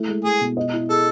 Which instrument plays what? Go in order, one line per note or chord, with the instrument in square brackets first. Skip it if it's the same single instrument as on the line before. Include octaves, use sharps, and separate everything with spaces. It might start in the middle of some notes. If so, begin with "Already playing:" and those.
Already playing: [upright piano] A3 E4
G#3
[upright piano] G#3 [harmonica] G#4
[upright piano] B2
D#5
E4
[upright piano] G#4 [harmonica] A4